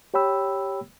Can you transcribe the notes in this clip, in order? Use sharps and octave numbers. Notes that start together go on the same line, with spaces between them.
G4 C#5 G5 B5 E6